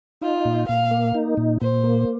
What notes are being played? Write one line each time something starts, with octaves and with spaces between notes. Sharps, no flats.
D#4 F4
A#2
A#2 F5
A#3
D#4
A#2
A#2 C5
A#3